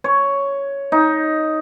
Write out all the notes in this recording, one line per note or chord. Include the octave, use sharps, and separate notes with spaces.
C#5
D#4